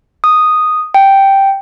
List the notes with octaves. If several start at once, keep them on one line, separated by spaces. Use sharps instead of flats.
D#6
G5